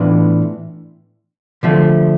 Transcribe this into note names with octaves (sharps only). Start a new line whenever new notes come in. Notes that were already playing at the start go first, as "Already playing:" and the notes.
Already playing: A2 E3 B3 D4 F4
D3 F3 A3